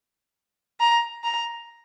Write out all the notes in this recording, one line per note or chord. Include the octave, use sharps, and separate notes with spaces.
A#5
A#5